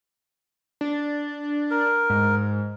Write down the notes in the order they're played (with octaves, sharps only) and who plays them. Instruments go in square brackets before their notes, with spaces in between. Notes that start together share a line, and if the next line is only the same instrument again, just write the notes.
[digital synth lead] D4
[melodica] A#4
[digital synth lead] G#2